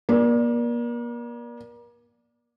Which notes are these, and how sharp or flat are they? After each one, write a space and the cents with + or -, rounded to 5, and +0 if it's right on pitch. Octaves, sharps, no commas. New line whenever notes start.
A#3 +40 D5 +0